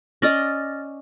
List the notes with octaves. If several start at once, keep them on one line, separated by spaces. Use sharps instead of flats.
C#4 D5 D#5 F6 A6 A#6